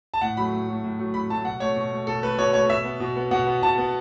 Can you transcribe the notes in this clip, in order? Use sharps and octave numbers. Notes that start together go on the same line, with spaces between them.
A5
A2 F#5
F#3 A3 B5
A2
F#3 A3
A2
F#3 A3
A2 B5
F#3 A3 A5
B2 F#5
A3 C#5
B2
A3
B2 A4
A3 B4
B2 C#5
A3 C#5
B2 E5
B3
B2
B3
B2 F#5
B3
B2 A5
B3